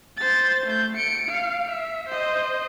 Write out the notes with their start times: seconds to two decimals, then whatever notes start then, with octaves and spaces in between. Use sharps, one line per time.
0.17 C5 A6
0.67 A3 G6
0.96 C#7 D7
1.29 F5
1.69 E5
2.09 C5 D#5